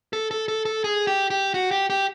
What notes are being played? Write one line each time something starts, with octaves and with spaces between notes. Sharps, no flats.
A4
A4
A4
A4
G#4
G4
G4
F#4
G4
G4